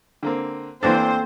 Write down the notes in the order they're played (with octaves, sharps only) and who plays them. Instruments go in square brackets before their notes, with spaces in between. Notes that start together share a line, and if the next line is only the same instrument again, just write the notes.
[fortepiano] D3 A#3 C4
[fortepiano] E2 E3 D4 [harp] A#3 F#4 A4 [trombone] C4 [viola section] C5